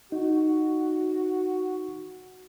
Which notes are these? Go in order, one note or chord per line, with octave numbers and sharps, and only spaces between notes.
D#4 F#4